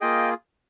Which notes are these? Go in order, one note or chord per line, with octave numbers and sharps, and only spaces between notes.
A#3 F4 G#4 D#5 G5